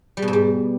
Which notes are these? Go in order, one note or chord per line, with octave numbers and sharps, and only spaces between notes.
G3
B2
G#2
G3